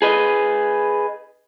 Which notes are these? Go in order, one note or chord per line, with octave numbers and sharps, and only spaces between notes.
G#4 B4 D#5